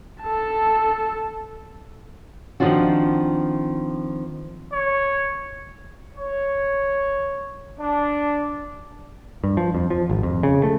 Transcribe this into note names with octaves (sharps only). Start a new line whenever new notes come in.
A4 A5
D#3 F3 C4 D4 F4 F#4
C#5
C#5
D4
G2
F3
F2
F3
G#1
F2
C#3
A3